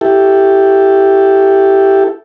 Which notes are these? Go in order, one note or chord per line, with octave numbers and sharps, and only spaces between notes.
E4 G4 A4